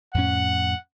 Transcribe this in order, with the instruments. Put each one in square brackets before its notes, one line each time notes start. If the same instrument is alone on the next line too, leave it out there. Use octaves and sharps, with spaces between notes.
[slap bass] F2 A2 C#4 [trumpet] F#5